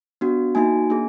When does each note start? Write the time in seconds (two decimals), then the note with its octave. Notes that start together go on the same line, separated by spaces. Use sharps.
0.21 B3 D4 F#4
0.55 A#3 D#4 F#4 G#5
0.90 A#3 D4 G#4